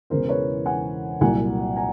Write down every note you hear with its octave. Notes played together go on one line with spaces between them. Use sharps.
E1 E2 C#3 E3 A#4 C5
B4 C#5
F#5 G#5
C2 A#2 F#3 F#5 G#5
G#5 A#5